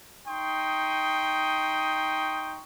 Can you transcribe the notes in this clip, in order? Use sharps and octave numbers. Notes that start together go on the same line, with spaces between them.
D#4 G5 C6 C#6 D#6